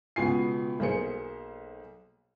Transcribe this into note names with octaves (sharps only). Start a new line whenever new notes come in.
C#2 B2 B3 F4 G#5 C7
B1 A#3 G#4 C5 C#7